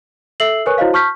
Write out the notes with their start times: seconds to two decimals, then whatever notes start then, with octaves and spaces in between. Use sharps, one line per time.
0.40 A4 E5 E6 C7 F#7
0.66 A#4 B4 C#5 G#5 C#6 F#6
0.78 E4 F#4 C5 C#5 D#5 F5
0.93 A5 C#6 F6 G6 B6